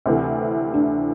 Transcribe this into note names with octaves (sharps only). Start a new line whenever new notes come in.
D2 C3 E3 A3
D4